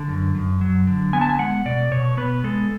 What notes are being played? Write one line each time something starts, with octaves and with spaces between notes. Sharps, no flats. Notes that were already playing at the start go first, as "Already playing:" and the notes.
Already playing: D3 A5
F#2
F#2
F#3
D3
B3 G#5
A5
G#5
G#3 F#5
B2 D5
B2 C#5
B3 B4
G#3 A4